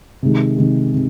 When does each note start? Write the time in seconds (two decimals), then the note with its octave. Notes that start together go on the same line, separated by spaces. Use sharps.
0.23 C3 D#3 G#3
0.58 C3 D#3 G#3
0.94 C3